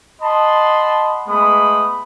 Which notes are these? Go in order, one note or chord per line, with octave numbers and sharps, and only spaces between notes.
D#5 F#5 A5 B5 C6
G#3 A3 B3 B5 D#6